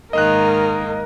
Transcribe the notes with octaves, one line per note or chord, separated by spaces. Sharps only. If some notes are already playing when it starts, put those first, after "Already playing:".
G#2 D#3 A#3 A#4 D#5 F#6